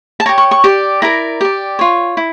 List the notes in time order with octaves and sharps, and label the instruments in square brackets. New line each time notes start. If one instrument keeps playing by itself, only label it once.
[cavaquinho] A5
C#5 A#5
G4
C#6
C#6
G4 D5
E4 A#4 D5 A#5
G4 D5
F4 C#5
E4